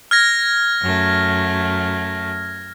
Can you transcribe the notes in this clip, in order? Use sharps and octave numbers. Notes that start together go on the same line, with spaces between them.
F6 G#6 A#6
F#2 A3